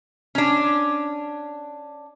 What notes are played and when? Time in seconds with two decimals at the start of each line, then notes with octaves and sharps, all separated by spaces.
0.35 C#4 D4